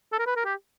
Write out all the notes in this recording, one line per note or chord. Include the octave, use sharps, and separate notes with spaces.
A4
A#4
B4
A#4
G4